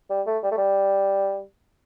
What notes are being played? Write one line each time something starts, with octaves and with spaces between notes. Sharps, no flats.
G3
A3
G3
A3
G3